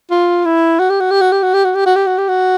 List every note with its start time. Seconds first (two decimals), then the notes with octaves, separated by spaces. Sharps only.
0.11 F4
0.45 E4
0.79 F#4
0.90 G4
1.00 F#4
1.11 G4
1.21 F#4
1.32 G4
1.43 F#4
1.54 G4
1.65 F#4
1.75 G4
1.86 F#4
1.96 G4
2.07 F#4
2.18 G4
2.28 F#4